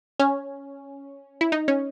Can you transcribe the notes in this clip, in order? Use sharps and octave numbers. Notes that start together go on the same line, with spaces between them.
C#4
E4
D#4
C#4